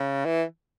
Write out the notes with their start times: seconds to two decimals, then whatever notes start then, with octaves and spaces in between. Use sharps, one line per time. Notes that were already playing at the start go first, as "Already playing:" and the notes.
Already playing: C#3
0.25 E3